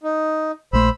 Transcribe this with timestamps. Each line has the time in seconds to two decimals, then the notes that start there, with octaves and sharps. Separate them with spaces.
0.03 D#4
0.73 A#1 A3 C5 B5 E6